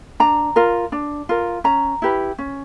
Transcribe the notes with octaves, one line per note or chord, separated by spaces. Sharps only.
D4 A#5
F4 A#4
D4
F4 A#4
C#4 A#5
E4 G4 B4
C#4